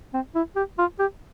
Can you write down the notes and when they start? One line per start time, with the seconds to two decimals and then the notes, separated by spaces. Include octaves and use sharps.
0.14 C4
0.35 E4
0.56 G4
0.78 F4
0.99 G4